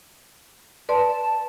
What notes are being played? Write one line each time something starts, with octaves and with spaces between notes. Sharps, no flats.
B4 D5 A5 C6